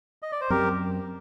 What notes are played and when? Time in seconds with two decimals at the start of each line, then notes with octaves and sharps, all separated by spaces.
0.22 D#5
0.32 D5
0.41 C5
0.50 F#2 F#3 C4 G4 A#4